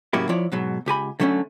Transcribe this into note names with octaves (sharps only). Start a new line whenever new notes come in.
A2 C#3 F#3 A#3 E4 G4
F3 E4 C#5 D5
G#2 B2 F#3
C#2 G4 G#5 B5
D3 F#3 A3 A#3 C#4